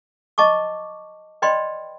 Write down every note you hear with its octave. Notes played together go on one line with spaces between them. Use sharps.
D#5 A5 C#6 D6
B4 D5 D#5 G5 B5 C6